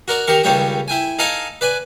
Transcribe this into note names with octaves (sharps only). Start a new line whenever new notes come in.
F#4 A#4 D5
D#3 G4 A#4 C#6
C#2 D#3 G3 G4 C#5 G5
E4 G5 G#5
D#4 A4 D#5 F5 G#5 A5
B4 D5 G#5